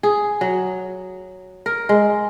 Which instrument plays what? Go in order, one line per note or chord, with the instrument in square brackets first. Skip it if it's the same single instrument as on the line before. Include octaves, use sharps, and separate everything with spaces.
[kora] G#4
F#3
A#4
G#3